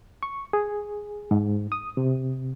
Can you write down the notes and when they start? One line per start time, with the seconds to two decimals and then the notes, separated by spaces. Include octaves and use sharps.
0.23 C#6
0.53 G#4
1.31 G#2
1.72 D#6
1.97 C3